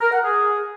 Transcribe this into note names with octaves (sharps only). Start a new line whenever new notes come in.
A#4
F#5
G#4